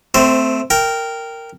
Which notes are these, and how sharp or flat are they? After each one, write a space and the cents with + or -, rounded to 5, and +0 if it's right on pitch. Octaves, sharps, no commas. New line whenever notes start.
A3 +0 C4 -20 C5 +0
A#4 -10 G5 +0